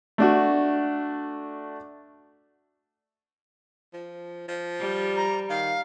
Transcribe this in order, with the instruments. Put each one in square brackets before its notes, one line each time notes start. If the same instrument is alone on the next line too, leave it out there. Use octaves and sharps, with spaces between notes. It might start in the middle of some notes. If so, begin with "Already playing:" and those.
[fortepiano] A3 D4 F#4
[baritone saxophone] F3
F3
[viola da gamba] G3
[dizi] A#5
[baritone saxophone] D#3 [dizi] F5